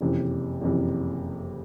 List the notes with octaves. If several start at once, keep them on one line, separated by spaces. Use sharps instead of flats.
F#1 F2 C3 E3
F#1 F2 C3 E3